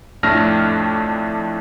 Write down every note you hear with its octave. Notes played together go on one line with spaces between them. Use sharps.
F2 A2 A3 D4 F6 A#6